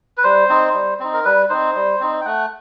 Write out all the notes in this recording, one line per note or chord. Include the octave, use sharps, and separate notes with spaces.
B4
G3 C5
C4 D#4
G3
C4 D#4
A#4
G3 B4
C4 D#4 C5
G3
C4 D#4
G5
A3 F#5